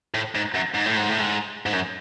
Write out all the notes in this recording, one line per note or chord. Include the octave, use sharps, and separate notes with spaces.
A2
G#2
F#2
G#2
A2
G#2
A2
G#2
G#2
F#2